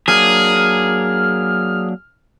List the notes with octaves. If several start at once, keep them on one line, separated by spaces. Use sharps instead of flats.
F#3 A#3 D4 G#4 F6